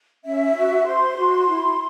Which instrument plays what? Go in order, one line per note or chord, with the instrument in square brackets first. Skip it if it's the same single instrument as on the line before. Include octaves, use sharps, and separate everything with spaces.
[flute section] C#4 E5
F#4
C5 C6
F#4
E4